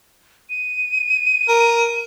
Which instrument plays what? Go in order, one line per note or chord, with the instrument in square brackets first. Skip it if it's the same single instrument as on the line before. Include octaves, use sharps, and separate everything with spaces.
[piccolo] D#7
[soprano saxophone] A#4